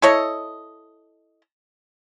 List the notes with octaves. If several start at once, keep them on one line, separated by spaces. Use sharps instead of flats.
E4 A4 C#5 D#5